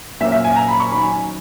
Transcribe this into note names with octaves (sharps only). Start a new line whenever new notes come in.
A#2 F#3 A#3 C#4 E5
E5
G#5
A#5
B5
C#6
D#3 F#3 C#4 B5
G#5